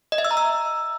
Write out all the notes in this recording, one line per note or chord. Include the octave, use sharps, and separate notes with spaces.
D#5
E5
E6
A#5
E6